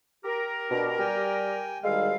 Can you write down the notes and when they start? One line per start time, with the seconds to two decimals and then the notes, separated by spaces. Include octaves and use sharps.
0.25 G4 A#4
0.71 B2 D4
0.99 G3 G5 G#5
1.84 D2 D#3 G3 G#3 A4 F5